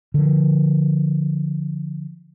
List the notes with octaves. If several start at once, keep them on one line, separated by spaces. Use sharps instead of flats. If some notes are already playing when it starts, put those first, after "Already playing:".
D3 F3